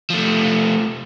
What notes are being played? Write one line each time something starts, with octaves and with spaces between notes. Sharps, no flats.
F3 A3